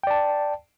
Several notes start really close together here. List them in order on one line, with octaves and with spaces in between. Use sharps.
G5 D5 A5